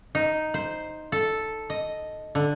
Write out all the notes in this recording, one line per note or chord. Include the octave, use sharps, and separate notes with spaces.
D#4
C5
A4
D#5
D3